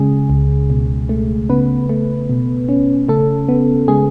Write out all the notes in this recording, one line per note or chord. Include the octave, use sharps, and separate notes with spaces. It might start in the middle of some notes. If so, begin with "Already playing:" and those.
Already playing: C#3 G#3 G#4
C#2
B2
A3
C#3 B3 B4
A3
B2
C#4
C#3 A3 A4
B3
C#3 G#3 G#4